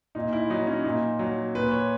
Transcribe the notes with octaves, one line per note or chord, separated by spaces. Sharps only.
A#2 D#4
E4
F#3 D#4
C#4
A#2 D#4
F#3
A#2 B4
C#5